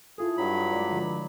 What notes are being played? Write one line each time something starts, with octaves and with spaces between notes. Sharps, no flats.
E4 F4 G#4 A4
G2 F#3 B5
G#3 D5
D3 F3